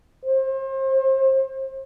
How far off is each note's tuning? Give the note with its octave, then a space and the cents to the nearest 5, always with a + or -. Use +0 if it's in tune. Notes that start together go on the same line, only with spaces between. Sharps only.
C5 +35